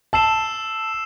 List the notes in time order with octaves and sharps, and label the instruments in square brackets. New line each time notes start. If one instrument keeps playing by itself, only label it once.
[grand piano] A5 [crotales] E6 C7 E7 G7